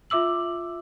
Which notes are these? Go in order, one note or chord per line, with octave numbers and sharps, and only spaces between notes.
F4 E5 D6 E6 F#7